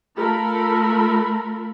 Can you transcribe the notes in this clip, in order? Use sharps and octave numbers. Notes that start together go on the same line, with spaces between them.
A3 F4 A4 A#4 B5